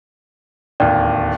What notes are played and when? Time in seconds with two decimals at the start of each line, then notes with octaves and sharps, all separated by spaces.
0.80 D1 D#2 D5 G5